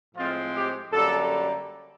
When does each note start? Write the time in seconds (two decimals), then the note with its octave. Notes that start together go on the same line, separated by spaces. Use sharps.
0.15 A2 F3 G#3 C4 F4
0.55 G4
0.93 F#2 D3 G3 A#3 A4